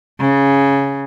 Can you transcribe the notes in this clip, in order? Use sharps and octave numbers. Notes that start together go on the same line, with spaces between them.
C#3